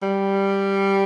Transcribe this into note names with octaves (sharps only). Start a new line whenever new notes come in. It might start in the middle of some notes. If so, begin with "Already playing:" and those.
G3